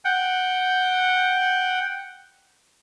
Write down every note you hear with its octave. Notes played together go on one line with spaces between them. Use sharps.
F#5 G5